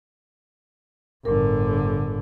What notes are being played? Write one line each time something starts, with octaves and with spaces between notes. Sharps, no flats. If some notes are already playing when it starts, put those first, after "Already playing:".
G1 A2 D3 A#4